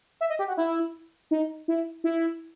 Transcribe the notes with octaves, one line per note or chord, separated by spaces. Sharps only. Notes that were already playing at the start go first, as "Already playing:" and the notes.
E5
D#5
G4
F#4
E4
D#4
E4
E4